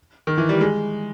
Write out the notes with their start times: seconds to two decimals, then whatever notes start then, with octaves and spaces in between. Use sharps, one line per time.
0.27 D#3
0.38 E3
0.49 G3
0.61 G#3